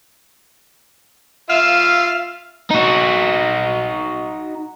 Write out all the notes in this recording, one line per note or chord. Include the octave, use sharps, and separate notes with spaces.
F4 E5 F5 E6
D#4 F#4